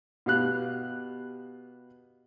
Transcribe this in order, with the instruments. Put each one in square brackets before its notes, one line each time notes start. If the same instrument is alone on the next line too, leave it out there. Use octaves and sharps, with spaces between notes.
[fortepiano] B2 G4 F5 F#6